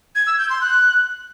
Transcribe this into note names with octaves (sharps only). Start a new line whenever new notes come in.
G#6
E6
G6
C6
F#6